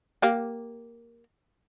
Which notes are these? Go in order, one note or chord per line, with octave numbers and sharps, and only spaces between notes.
A#3 G4